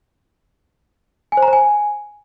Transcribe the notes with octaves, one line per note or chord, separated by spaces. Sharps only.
G#5
C5
A#5
C5
G#5